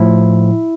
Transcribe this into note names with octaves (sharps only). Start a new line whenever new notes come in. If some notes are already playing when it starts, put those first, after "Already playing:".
Already playing: A2 F3 E4